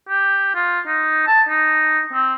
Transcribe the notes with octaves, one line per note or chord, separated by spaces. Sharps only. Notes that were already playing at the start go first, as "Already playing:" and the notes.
G4
F4
D#4
A5
D#4
C4